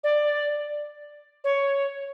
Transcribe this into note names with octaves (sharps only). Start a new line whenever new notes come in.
D5
C#5